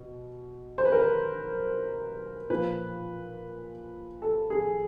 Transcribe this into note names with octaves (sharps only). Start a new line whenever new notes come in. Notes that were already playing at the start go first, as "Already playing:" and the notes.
Already playing: B2
C5
B4
A#4
B4
A#2 F3 B4
A4
G#4